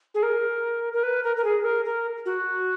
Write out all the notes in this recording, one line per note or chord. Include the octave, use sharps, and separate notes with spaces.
G#4
A#4
A#4
B4
A#4
A#4
G#4
A#4
A#4
F#4